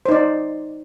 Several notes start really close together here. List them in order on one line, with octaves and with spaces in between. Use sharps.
C5 D#4 D5